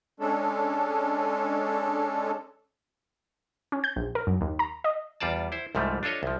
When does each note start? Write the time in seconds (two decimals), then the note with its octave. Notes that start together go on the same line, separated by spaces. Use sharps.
0.20 G#3 C#4 D4 A4
3.72 C#4
3.84 G6
3.96 A#1
4.15 A#4
4.27 F#2
4.41 D#2
4.59 A#5
4.84 D#5
5.20 E2 G3 F4 D5 A5
5.52 E4 C5
5.75 C2 G#2 F3 G3 A3
6.03 D4 F4 A4 C#5 D#5
6.23 C2 F3